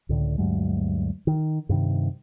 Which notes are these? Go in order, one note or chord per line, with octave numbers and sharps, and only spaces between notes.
C#2 A2 D3
D2 G2 F#3 G#3
D#3
G2 C3 D#3